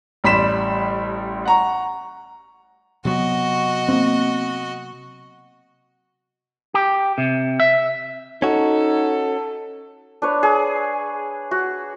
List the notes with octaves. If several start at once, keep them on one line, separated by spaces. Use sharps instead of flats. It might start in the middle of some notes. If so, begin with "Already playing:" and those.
A1 G3 B5 C6 B6 E7
F#5 A#5 C#6
C3 F#3 B3 F#4 D#5
A#3 C4
G4
C3
E5
C#4 D#4 F#4 A4
D4 B4 C#5
G#4
F#4